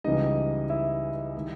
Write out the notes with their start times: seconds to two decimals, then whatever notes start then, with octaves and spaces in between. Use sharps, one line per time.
0.04 C#2 C#3 E3 G3 D#4 D#5
0.70 E4 E5
1.37 D#3 G3